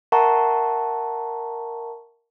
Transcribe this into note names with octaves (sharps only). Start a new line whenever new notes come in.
A#4 E5 F#5 A5 A#5 C#6